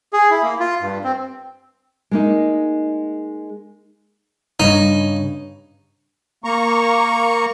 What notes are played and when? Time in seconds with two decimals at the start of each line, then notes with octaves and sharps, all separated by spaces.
0.13 G#4
0.30 E4
0.42 A#3
0.60 F4
0.81 G2
1.04 C4
2.11 G#3 A#3 D#4
4.60 G2 C#3 D#4 C#5
6.44 A#3 A#5 C#6